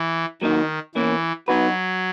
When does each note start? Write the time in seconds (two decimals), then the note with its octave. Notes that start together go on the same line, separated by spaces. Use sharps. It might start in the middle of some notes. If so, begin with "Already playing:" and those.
Already playing: E3
0.42 D#3 F#3 A#3 D#4
0.95 B2 E3 A#3 C#4
1.48 F#3 B3 D#4 F#4 B4